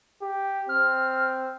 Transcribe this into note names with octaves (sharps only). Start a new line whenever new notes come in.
G4
C4 F6